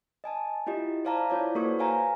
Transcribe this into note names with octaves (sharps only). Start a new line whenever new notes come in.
D#5 G#5 A5
E4 F4 G4 D#5
C5 D5 F5 A5 A#5
E4 F4 C#5 D5
A#3 F#4 A4 B4 C5 C#6
B4 C#5 F5 G#5 A#5